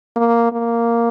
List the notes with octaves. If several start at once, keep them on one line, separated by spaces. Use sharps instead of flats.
A#3
A#3